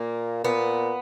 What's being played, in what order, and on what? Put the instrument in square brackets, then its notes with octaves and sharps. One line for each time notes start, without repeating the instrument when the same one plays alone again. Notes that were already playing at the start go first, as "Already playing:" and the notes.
Already playing: [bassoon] A#2 [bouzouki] A#3
[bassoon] A#2 [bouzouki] B3